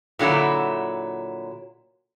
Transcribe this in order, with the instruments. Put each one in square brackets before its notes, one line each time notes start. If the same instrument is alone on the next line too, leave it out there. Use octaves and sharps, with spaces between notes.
[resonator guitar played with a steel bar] A#2 D3 F#3 E4